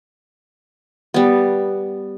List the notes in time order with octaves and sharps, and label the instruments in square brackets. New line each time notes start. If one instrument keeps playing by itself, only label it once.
[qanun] G3 B3